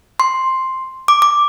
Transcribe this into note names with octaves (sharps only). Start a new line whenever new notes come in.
C6
D6
D6